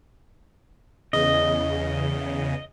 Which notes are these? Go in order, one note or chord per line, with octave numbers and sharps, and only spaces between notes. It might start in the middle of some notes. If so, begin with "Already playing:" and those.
E2 C#3 D#5